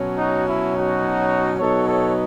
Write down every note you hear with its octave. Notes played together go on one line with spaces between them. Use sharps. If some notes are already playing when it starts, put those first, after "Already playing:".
Already playing: B2 F#3 C#4
D#4 F#4
E4
D#4 F#4
B2 F#3 B3 D#4 A4 C#5
A4 C#5